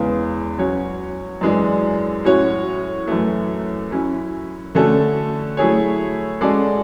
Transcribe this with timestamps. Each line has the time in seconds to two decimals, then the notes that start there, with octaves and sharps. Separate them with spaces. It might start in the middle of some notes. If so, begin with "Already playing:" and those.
Already playing: E2 C#3 G#3 B3
0.58 F#3 C#4 F#4 C#5
1.41 F#2 E3 G#3 D4
2.24 A2 F#3 C#4 F#4 C#5
3.07 F#2 E3 A3
3.91 F#3 C#4 E4
4.75 D3 A3 C#4 F#4 A4
5.57 F#3 A3 E4 G#4 C#5
6.41 G#3 C#4 F#4 A4 D5